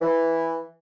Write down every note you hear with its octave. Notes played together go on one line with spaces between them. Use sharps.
E3